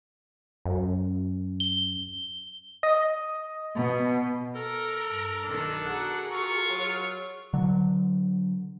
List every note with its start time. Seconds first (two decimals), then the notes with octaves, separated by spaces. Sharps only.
0.65 F#2
1.60 G7
2.83 D#5
3.75 B2
4.55 A4 A#4
5.08 G2
5.45 B1 D#3 D4
5.86 F#4 G#4 A#4 F#5
6.33 F4 C#6
6.70 F#3
7.53 D3 F#3